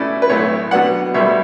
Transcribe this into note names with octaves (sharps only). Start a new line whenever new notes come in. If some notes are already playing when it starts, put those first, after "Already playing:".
Already playing: B2 A3 C#4 E4 D5
B4
B1 A2 E3 A3 C#5
B2 F#3 B3 D4 F#5
B1 B2 G3 E5